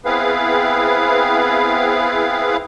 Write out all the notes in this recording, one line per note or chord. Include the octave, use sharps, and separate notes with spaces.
B3 C4 E4 G#4 B4 F5